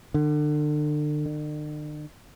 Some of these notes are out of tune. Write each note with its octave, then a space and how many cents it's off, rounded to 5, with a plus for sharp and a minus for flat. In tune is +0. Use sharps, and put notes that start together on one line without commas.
D3 +35
D3 +45